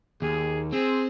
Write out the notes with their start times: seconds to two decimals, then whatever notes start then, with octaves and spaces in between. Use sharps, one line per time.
0.22 D#2 G#4
0.72 C4 G#4